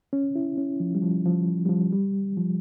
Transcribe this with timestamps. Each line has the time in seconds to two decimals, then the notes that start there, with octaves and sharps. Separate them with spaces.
0.13 C#4
0.36 E4
0.58 C#4
0.80 F3
0.95 G3
1.02 F3
1.25 F3
1.65 G3
1.69 F3
1.92 G3
2.37 F3